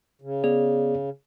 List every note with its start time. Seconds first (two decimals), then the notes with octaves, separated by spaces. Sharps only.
0.22 C#3
0.44 B3 G#4 D5